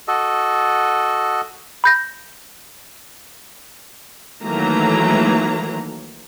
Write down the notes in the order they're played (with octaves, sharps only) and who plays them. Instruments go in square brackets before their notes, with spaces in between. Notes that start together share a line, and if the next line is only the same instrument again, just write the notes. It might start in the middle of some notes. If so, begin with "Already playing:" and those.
[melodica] F#4 A4 D#5
[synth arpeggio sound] B5 G6 A#6
[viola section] D#3 E3 F#3 A3 A#3 A#5